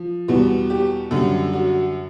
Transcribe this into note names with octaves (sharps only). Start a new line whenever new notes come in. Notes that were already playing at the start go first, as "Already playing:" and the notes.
Already playing: F3
E2 B2 G3 B3
G4
F#2 D3 G3
F#4